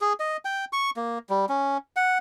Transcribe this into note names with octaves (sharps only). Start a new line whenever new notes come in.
G#4
D#5
G5
C#6
A#3
G3
C#4
F#5